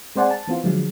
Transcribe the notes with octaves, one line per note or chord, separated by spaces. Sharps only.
G#3 C4 C5 D5 F#5 G#5
A5
E3 B3 C4 F4
D3 F3 F#3 G#3